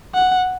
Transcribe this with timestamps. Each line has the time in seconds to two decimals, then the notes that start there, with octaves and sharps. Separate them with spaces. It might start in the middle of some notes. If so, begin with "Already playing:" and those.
0.14 F#5